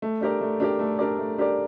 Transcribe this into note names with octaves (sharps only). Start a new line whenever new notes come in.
A3
D4 G4 A#4 D5
A3
D4 G4 A#4 D5
A3
D4 G4 A#4 D5
A3
D4 G4 A#4 D5